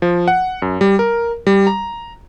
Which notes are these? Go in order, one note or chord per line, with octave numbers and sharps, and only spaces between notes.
F3
F#5
F#2
G3
A#4
G3
A#5